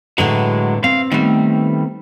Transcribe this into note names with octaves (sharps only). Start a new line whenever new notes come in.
A2 D3 F#3 G#3 B4
C4 F5
D#3 G3 A3 B3